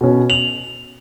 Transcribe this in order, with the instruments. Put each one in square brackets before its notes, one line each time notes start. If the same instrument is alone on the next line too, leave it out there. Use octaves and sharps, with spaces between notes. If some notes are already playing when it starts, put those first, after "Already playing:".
[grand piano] B2 C#4
[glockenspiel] F7 [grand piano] F#7